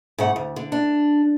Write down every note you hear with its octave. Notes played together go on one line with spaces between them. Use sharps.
G#2 C#3 A3 F#5
D2
D3
D4